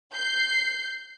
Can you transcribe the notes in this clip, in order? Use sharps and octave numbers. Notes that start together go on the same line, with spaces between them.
G6 C7